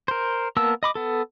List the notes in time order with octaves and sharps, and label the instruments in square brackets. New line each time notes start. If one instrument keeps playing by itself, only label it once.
[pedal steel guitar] A#4 C5
A#3 B3 A#4 A5 E6
D#5 B5 D6
B3 A4